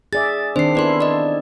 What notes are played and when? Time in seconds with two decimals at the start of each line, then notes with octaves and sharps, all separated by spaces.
0.13 G#4 D5 E5 A6
0.56 D#3 C4 D4 C5 C7
0.75 B3 E4 A4 B4 D5 C6
1.01 D5 D#5